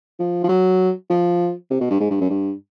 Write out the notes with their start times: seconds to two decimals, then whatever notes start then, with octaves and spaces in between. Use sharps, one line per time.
0.19 F3
0.44 F3
0.49 F#3
1.10 F3
1.70 C3
1.81 B2
1.90 G2
2.00 G#2
2.11 G2
2.20 F#2
2.30 G2